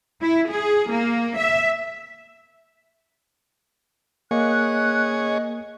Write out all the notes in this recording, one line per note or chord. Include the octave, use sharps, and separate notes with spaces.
E4
G#4
A#3
E5
A#3 G#4 C#5 D#5 F#6